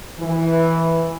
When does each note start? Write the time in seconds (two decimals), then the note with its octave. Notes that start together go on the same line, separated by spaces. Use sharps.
0.18 E3